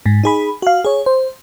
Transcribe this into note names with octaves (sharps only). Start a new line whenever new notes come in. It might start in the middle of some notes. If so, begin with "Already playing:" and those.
G#2
D#4 G#4 B5
F#4 F5
G#4 C#5
C5